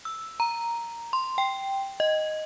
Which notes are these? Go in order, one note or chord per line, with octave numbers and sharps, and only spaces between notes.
E6
A#5
C6
G5
D#5